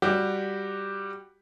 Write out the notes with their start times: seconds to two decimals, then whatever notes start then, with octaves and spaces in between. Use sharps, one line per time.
0.02 G3 F#4 G4